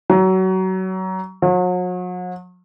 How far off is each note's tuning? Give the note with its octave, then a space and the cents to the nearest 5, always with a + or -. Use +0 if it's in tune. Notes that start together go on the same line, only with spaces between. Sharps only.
F#3 +25
F#3 -40